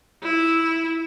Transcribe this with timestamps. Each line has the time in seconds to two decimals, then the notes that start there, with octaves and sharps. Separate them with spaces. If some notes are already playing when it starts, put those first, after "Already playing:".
0.23 E4